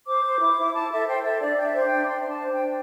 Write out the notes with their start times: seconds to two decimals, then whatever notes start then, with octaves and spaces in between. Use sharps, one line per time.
0.07 C5 D6
0.24 C5
0.41 E4
0.57 E4
0.74 E4 A5
0.90 A4 E5
1.07 C5 G5
1.23 A4 E5
1.40 D4 D5
1.55 D4 G5
1.62 E5
1.74 C5
1.85 G5
1.90 D4
2.07 D4 C6
2.22 D4 C6
2.30 A5
2.41 C5
2.52 G5
2.58 D4